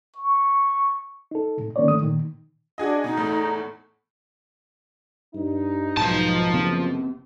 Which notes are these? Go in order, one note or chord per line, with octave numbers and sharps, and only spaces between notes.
C#6
D#4 A4
A2 C3
D3 D#3 A#3 C#4 C#5 D5
G#2 D#3 A3 D#6
A#2 D#3
D4 F#4 G#4 D#5
B2 D#4
E2 A2 A3
G2 D#4
B1 G#2 F3 A5
F#1 C3 B3 C4